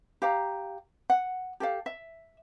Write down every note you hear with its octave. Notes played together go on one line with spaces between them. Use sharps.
G4 F5 A#5
F#5
G4 A4 F5
E5